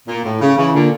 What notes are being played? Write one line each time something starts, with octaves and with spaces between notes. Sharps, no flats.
A#2
A2
C#3
C#3 E3
A#2 D3